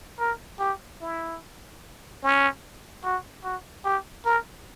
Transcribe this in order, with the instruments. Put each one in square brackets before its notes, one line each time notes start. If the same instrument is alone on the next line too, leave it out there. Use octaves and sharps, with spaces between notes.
[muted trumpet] A#4
G4
E4
C#4
F#4
F#4
G4
A#4